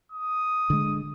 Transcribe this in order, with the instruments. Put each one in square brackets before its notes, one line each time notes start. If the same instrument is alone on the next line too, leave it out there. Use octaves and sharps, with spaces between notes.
[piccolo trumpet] D#6
[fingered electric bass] D3 G#3